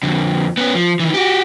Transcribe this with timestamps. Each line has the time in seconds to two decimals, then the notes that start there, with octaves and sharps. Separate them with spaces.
0.03 F2 D3
0.57 B3 C#4
0.75 F3
1.00 D#3 E3
1.14 F#4 G4